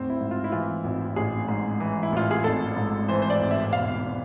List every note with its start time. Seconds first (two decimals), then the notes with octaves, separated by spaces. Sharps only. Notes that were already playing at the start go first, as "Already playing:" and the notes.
Already playing: G#1 D2 C4
0.10 E4
0.20 G#2
0.31 F4
0.44 E4
0.52 E3 F4
0.84 G#1
1.16 A1 G#4
1.48 G#2
1.80 E3
2.03 E4
2.12 A1 F4
2.31 G#4
2.44 G#1 A4
2.76 G#2
3.08 E3 C5
3.22 C5
3.30 D5
3.41 G#1
3.51 E5
3.73 E1 F5